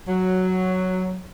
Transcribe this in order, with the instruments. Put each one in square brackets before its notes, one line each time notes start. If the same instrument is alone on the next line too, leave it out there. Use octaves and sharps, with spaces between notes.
[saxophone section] F#3